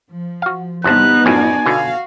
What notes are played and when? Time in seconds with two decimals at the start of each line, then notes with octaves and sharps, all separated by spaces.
0.10 F3
0.42 F#4 F5
0.84 E2 C3 G3 B3 D#4 B4 A5 F#6
1.26 F#2 A2 F3 F#4 D5 G#5
1.66 B2 D3 F#4 F5